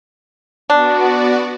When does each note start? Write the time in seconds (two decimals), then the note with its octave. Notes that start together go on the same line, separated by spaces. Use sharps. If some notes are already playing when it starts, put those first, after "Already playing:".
0.70 B3 D4 F#4 D5